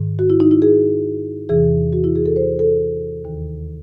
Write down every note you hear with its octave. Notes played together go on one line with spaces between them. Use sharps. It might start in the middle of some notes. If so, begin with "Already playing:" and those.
Already playing: G#2 D#3
F#4
E4
D#4
E4
G#4
E2 C3 E3 G#4
F#4
E4
G#4
A4
C5
A4
D#2 D#3